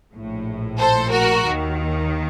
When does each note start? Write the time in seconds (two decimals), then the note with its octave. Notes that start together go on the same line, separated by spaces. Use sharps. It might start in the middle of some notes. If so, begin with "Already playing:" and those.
0.13 A#1 A2
0.79 A4 C5
1.11 F#4 A#4
1.44 D#2 D#3